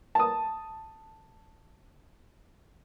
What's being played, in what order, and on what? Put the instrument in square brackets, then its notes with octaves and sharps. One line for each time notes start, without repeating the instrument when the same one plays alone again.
[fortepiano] A5 D#6